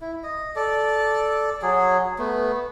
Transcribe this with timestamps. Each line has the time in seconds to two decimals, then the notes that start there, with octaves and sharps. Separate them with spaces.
0.01 E4
0.23 D#5
0.56 A4 D5
1.62 F#3 G#4
2.19 A3 B3